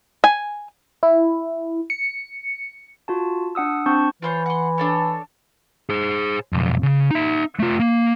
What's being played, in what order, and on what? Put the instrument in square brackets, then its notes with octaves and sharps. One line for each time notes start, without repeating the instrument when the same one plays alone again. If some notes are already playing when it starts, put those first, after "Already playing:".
[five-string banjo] G#5
[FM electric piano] E4
C#7
[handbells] F4 F#4 A5
D4 F#5 D#6 E6
C4 D4 A5 C#6 G6
[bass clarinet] E3 [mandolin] F4 C5 C#5
[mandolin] F#5 C6
D4 A4 C#5
[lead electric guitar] G#4 C5
B1 F2
C#3
D#4 E5
A3 F4
A#3